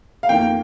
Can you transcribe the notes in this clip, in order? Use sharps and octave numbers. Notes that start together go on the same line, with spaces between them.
F5
F2 D#3 A#3 G5